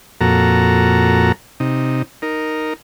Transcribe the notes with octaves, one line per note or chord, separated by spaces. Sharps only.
F2 A#2 F#4 A4 A#5
C3 D#4
D#4 A#4